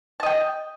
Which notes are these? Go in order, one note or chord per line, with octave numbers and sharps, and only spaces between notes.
D#5 G5 A5